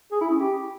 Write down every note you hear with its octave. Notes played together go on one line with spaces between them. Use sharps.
G#4
E4
C#4
G4